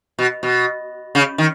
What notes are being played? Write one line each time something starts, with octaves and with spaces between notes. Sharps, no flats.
B2
B2
C#3
D#3